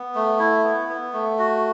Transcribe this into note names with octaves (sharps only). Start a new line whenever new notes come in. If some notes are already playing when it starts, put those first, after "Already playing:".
Already playing: B3
A3
E4
B3
B3
A3
F#4